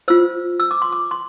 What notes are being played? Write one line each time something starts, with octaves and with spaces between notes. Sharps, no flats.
F4 C5 E6
E6
D6
C6
D6
C6